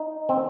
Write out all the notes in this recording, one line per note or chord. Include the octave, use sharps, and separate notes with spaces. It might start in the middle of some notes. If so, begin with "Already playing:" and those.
Already playing: D#4
C4